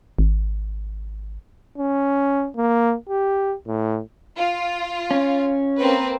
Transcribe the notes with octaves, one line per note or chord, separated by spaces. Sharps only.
G#1
C#4
A#3
G4
A2
F4
C#4
A#3 C4 B4